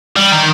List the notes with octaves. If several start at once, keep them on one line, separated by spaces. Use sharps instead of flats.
G3
D#3